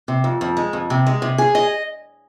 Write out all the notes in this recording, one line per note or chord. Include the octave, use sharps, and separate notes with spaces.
C3
F2
F2
G#3
F2
C3
G#3
C3
G#4
D#5